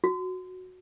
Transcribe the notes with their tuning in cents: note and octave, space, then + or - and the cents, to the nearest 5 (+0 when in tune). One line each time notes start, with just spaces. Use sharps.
F#4 -10